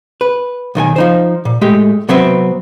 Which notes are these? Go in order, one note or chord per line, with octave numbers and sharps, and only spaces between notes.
B4
B1 D#3 A#4 G#5
F3 D#4 C5
A#2
A2 G#3 A3 G4
C3 F#3 B3 C4 B4 E5